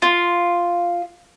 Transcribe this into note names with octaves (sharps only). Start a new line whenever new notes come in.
F4